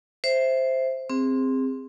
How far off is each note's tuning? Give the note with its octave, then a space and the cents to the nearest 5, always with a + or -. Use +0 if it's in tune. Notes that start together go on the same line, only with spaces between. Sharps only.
C5 +0 E5 +0
C4 +0 G#4 -25